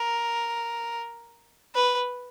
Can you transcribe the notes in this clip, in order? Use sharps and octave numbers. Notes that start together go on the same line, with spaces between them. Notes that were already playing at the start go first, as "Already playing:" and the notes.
Already playing: A#4
B4